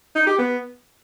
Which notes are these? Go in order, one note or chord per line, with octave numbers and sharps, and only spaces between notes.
D#4
G4
B3